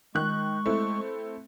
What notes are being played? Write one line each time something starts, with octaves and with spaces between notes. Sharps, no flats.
D#3 G#3 C#6 F#6
A3 C4 E4